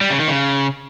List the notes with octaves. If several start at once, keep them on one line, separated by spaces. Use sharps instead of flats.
G3
C#3
D#3
C#3